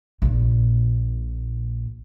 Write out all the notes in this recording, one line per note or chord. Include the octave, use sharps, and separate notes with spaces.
A#1 A#2